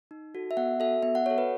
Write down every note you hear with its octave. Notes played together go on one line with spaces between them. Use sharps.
D#4
F#4 A4
E5
B3 F#5
F#4 A4 E5
B3 E5
F#5
F#4 A4 C#5
B4